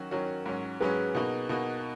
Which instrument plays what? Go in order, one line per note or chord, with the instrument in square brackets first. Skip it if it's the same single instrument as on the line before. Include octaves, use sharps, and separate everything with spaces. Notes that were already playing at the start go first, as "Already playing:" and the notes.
Already playing: [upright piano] D#3 F#3 C#4 F#4
[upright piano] D#3 F#3 C#4 F#4 [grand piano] A#4 C#5
[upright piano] G#2 F#3 C#4
[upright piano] G#2 F#3 C#4 [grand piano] G#4 B4
[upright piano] B2 A#3 D#4 F#4
B2 A#3 D#4 F#4